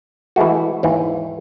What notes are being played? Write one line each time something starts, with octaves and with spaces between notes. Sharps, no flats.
E3 G#3 A3 F#4
D#2 G#2 E3